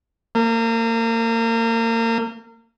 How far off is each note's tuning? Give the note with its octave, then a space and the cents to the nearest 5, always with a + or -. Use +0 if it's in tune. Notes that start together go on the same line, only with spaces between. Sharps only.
A#3 -35